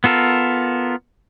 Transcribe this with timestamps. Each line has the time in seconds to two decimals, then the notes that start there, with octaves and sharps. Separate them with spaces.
0.04 B3 F4 A4 A#4